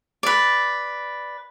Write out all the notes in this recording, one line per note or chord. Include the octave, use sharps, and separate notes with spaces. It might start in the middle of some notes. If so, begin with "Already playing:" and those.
B4 D5